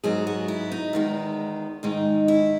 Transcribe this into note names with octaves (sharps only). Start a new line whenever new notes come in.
G#2 F#3 B3 G#4
F#4
E4
D#4
E2 D#3 G#3 B3
G#2 D#3 G#3 D#4
E4